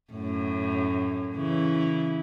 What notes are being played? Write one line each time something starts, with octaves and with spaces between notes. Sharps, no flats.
F#2 A2
C#3 E3 E4